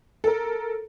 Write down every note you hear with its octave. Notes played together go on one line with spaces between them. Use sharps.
A4 A#4